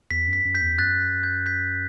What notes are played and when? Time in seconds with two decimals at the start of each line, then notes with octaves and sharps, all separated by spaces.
0.11 E2 B6
0.28 F#2
0.33 B6
0.45 F#2
0.55 G6 B6
0.61 E2
0.78 F#2 F#6 A6
1.23 G6
1.46 G6 B6